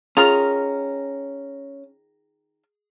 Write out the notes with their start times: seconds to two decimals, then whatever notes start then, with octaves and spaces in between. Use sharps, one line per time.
0.17 D#3 C#4 F4 G#4 A#4 F7